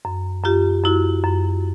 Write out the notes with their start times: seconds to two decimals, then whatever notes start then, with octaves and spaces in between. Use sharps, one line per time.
0.05 F#2
0.44 F#2 F4 G4
0.84 F#2 E4 F#4
1.24 F#2